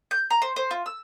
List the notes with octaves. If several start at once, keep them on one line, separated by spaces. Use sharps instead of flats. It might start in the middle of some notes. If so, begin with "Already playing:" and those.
G6
A#5
C5
C5
F4
E6